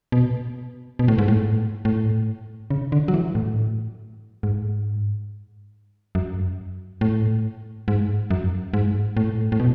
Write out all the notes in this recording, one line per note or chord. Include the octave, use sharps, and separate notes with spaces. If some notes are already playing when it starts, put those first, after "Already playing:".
B2
B2
A2
G#2
A2
A2
C#3
D3
F#3
E3
A2
G#2
F#2
A2
G#2
F#2
G#2
A2
A2
B2